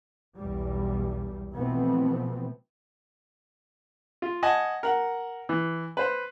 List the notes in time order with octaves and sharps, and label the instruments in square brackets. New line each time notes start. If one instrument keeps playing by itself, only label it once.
[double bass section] B1 E2 G3
B2 E3 F3 A3 B3 C4
[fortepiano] F4
D#5 F#5 G#5 A5
A#4 F#5
E3
B4 C5